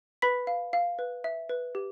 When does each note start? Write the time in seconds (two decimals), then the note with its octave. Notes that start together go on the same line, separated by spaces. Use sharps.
0.22 B4 B5 B6
0.47 F5
0.73 F5
0.99 B4
1.24 E5
1.49 B4
1.75 G4